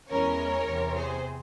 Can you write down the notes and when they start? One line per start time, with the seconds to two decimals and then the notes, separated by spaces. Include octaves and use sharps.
0.10 E2 E3 G#3 C#4 A#4 C#5
0.68 E2 C3 E3
0.95 G#4 C5